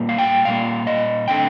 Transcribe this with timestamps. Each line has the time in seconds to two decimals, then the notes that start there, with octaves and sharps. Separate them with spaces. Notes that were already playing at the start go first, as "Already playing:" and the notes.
Already playing: A#2 G3 A#3
0.09 F5
0.18 G5
0.45 A#2 G3 A#3 F5
0.87 D#5
1.28 D3 A3 C4 G5